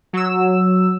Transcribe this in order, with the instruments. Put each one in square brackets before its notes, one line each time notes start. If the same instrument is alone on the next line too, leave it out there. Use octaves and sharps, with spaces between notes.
[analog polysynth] F#3 E6